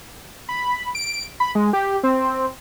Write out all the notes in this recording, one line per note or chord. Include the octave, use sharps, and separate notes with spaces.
B5
D7
B5
G#3
G4
C4